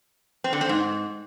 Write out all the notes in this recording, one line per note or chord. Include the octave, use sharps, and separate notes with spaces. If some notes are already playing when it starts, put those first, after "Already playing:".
C4
D3
C4
G#2